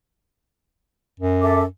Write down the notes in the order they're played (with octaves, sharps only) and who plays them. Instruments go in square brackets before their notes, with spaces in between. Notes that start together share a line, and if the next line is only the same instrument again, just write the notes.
[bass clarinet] F#2
[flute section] A4 E5 D6